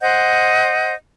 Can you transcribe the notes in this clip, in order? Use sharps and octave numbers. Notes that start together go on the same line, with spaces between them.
C5 D#5 F#5 G6